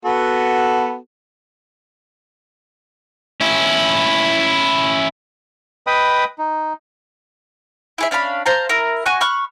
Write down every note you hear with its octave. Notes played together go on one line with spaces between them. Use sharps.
B3 F#4 A4
C#4 E4
B4 D#5 G5 B5 D#6
D#4
E4 G#4 E5
C#4 D4 F5 B5
C5 F5 A5 A#5
E4 A#4
F#4 G#5 C#6 F#6
B5 C#6 F6 F#6